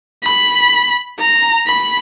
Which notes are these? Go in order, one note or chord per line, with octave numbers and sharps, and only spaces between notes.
B5
A#5
B5